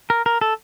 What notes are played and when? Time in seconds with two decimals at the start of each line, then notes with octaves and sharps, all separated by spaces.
0.10 A#4
0.26 A#4
0.41 A4